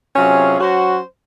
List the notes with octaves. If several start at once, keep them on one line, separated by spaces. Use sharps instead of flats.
C3 F#3 C#4 F4 G#4
F#3 C#4 F#4 C5